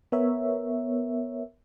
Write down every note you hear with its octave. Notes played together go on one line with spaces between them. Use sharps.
B3 A#4 C#5 E5